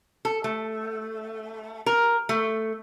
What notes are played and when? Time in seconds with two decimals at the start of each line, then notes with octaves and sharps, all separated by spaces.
0.25 A4
0.44 A3
1.86 A#4
2.29 A3